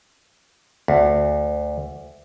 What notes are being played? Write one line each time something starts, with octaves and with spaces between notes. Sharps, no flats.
D2